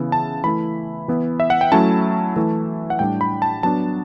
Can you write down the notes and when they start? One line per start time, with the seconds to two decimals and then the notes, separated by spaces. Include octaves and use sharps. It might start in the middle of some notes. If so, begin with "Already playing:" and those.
Already playing: C#3 E3 B3 E4
0.12 A5
0.44 E3 A3 E4 B5
1.08 E3 B3 E4
1.40 E5
1.50 F#5
1.61 G5
1.72 F#3 A3 C#4 E4 A5
2.36 E3 A3 E4
2.90 F#5
2.99 A2 G3 D4 G5
3.21 B5
3.42 A5
3.63 F#3 B3 D4 A5